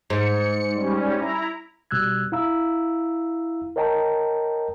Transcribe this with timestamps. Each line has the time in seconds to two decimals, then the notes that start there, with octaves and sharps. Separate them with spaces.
0.10 G#2 C#7
0.75 G3 C#4
1.18 E4 A#5
1.91 B2 G3 E6 F#6 G#6
2.32 E4 F5 A#5 E6
3.76 A#4 C#5 D#5 G5 A5 A#5